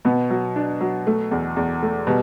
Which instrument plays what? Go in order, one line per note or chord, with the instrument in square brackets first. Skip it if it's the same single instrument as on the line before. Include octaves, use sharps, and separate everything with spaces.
[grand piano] B2 [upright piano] B3
[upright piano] F#3
D4
F#3
A3
E2
E2
A3
[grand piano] B2 [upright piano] G3